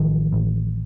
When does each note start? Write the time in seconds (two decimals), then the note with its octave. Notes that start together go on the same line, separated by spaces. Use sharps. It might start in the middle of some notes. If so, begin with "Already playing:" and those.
Already playing: A1 D#3 F3
0.33 A1